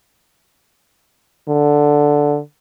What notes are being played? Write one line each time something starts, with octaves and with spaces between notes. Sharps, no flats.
D3